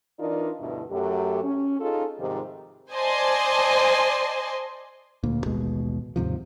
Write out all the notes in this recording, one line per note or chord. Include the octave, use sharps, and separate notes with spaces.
E3 D4 D#4 F4 A#4 D5
D2 G2 B2 E4
F#2 F#3 A3 G4
C#4
C#4 D#4 F4 G#4 A4
G#2 C3 D#3 F3 G3
C5 D5 D#5 G#5 A5 C6
D2 A#2 A#3
A1 D#2 B2 G#3
D#2 G#2 C3 F3